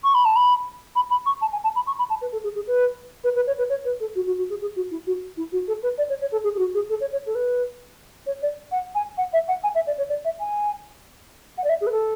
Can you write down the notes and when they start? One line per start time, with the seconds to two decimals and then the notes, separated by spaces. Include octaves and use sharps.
0.04 C#6
0.14 B5
0.25 A5
0.35 B5
0.95 B5
1.10 B5
1.26 C#6
1.41 A5
1.52 G#5
1.63 A5
1.75 B5
1.86 C#6
1.98 B5
2.09 A5
2.21 B4
2.32 A4
2.43 G#4
2.55 G#4
2.67 B4
3.23 B4
3.35 B4
3.46 C#5
3.58 B4
3.69 C#5
3.84 B4
4.00 A4
4.15 F#4
4.26 F#4
4.38 F#4
4.49 G#4
4.61 G#4
4.76 F#4
4.90 E4
5.06 F#4
5.37 E4
5.52 F#4
5.67 A4
5.82 B4
5.97 D5
6.09 C#5
6.20 C#5
6.31 A4
6.43 G#4
6.54 G#4
6.58 F#4
6.74 G#4
6.89 A4
7.00 C#5
7.12 C#5
7.26 A4
7.35 B4
8.26 C#5
8.42 D5
8.71 F#5
8.94 G#5
9.17 F#5
9.33 E5
9.48 F#5
9.63 G#5
9.74 E5
9.86 D5
9.97 C#5
10.09 D5
10.24 E5
10.39 G#5
11.57 F#5
11.63 D5
11.69 E5
11.80 G#4
11.86 B4
11.91 A4